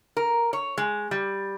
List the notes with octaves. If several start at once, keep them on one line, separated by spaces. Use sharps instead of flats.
A#4
C#5
G#3
G3